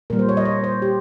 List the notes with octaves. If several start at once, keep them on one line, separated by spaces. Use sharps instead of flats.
A#2 G3 A#3 A#4
C5
C#5
D#5
C#5
C5
G4